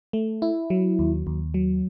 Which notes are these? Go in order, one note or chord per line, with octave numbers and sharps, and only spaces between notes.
A3
E4
F#3
D#2
D#2
F#3